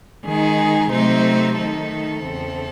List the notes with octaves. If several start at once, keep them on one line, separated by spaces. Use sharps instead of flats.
D#3 G#3 D#4 G#4
C3 F#3 A3 C4 D#4 C5
D#3 A3 D#4 A4
E2 C#3 E3 C4